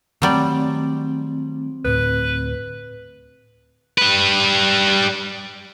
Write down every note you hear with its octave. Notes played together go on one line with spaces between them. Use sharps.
D#3 F#3 G3 A3 C4 D5
D2 A2 B4
G3 B4